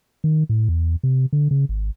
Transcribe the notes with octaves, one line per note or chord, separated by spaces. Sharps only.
D#3
A2
E2
C3
D3
C#3
G#1